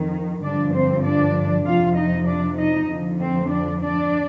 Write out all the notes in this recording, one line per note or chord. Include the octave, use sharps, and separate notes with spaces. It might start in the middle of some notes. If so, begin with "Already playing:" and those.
Already playing: F2 D#3
G2 D3 F3 D4 D5
C4 C5
D4 D5
F2 C3 F3 F4 F5
D#4 D#5
D4 D5
D#4 D#5
F2 D3 F3
C4 C5
D4 D5
D4 D5